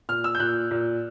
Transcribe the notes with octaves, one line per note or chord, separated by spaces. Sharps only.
A#2 F6
E6
G6
A#2 F#6
A#2